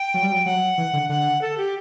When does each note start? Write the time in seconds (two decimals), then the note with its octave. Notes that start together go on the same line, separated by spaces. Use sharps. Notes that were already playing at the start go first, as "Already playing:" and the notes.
Already playing: G5
0.14 F#3
0.23 G3
0.32 F#3
0.45 F#3 F#5
0.78 E3
0.93 D3
1.09 D3 F#5
1.42 A4
1.58 G4